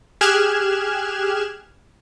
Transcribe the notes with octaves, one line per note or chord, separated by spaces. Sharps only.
G4 G#4 F6 F#6 G#6 E7